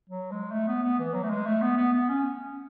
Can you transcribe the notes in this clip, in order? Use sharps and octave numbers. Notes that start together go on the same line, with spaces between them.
F#3
G#3
A3
B3
B3
E3
F#3
A3
G#3
A3
B3
B3
B3
C#4